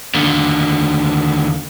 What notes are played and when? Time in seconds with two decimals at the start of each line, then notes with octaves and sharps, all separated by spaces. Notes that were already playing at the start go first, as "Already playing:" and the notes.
0.15 D#2 D3